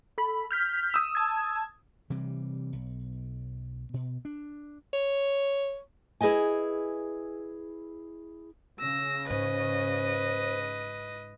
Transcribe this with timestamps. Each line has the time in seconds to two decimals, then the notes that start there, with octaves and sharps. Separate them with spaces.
0.18 A4 B5
0.51 F6 G6 B6
0.94 D#6 E6
1.15 A5 G#6
2.10 C3 E3 G3
2.73 B1
3.94 B2
4.25 D4
4.93 C#5
6.21 E4 G#4 B4 D#5 G#5
8.80 C#3 E6 A#6
9.30 G#2 B4 C5 D#5